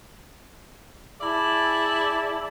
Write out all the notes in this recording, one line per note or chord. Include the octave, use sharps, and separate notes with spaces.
E4 G#4 D5 E5 A5